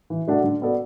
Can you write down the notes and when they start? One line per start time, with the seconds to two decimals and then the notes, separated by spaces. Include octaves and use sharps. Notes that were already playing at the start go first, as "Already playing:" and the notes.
0.10 E3
0.28 A3 D4 F#4 A4
0.44 D3
0.61 B3 F#4 A4 D5